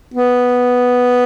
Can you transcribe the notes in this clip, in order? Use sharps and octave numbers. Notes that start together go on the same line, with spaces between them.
B3